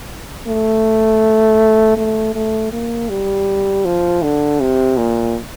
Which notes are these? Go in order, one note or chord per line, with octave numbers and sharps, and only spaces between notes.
A3
A3
A3
A#3
G3
F3
D3
C3
A#2